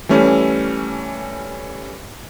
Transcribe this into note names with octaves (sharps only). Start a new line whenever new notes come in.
E3 G3 A3 C#4